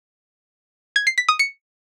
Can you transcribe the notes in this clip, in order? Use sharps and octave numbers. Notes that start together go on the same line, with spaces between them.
G#6
C7
B6
D#6
C#7